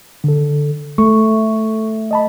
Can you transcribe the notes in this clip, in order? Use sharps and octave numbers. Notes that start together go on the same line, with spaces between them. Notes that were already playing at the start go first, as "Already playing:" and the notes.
D3 A4
A3 C#6
D#5 A5 B5